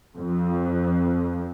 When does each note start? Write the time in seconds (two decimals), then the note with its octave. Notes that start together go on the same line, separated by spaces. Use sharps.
0.16 F2